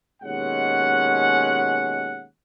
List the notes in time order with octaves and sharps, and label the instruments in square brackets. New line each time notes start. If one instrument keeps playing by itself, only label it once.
[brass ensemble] D#2 B2 G#3 C#4 F#5